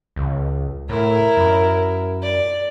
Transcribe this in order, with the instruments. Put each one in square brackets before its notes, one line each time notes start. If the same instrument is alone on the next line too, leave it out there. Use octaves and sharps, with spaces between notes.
[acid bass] C#2
[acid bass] A2 [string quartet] E4 A#4
[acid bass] F#2
[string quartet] D5